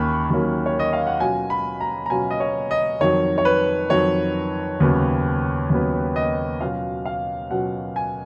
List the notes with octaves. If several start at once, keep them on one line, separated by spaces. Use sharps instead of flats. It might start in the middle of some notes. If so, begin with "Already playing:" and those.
Already playing: D#2 D#3 A#3 C#4 B5 C#6
D#2 D#3 F#3 A#3 C#4
C#5
D#5
F5
F#5
B2 F#3 C#4 F4 G#5
B5
A#5
A#5
B2 F#3 C#4 F4 G#5
D#5
C#5
D#5
F2 D#3 F#3 C#5
C#5
B4
F2 D#3 F#3 C#5
D#2 C#3 F#3 B3
D#2 C#3 F#3 B3
D#5
B2 F#3 C#4 F4 F5
F5
B2 F#3 C#4 F4 F#5
G#5